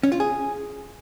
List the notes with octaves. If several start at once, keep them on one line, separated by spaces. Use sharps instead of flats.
C#4
F4
G#4